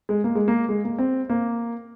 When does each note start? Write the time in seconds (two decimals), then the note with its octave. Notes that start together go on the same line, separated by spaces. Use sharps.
0.09 G#3
0.24 A#3
0.35 G#3
0.48 A#3
0.69 G#3
0.85 A#3
0.98 C4
1.30 A#3